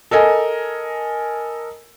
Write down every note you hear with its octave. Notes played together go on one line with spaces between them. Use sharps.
A4 A#4 D#5 G#5